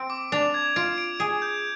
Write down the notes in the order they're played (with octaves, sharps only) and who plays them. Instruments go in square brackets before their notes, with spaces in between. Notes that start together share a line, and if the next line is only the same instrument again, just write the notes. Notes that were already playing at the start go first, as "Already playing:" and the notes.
Already playing: [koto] C4 [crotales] D7
[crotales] D6
[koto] D4 [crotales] F7
[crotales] G#6
[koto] F4 [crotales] D7
[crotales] D7
[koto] G#4 [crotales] D7
[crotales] G6